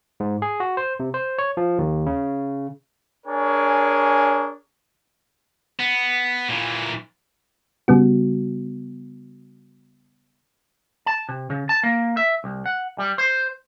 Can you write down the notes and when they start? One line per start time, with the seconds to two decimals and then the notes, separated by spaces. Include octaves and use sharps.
0.20 G#2
0.42 G#4
0.60 F#4
0.77 C5
1.00 C3
1.14 C5
1.39 C#5
1.57 F3
1.79 D#2
2.06 C#3
3.26 D4 G#4 A#4 C#5 G#5 C#6
5.79 B3
6.49 A#2 E3
7.88 C#3 G3 B3 F#4
11.06 A5
11.29 C3
11.50 C#3
11.69 A5
11.83 A#3
12.17 E5
12.44 C2
12.66 F#5
12.98 G3
13.18 C5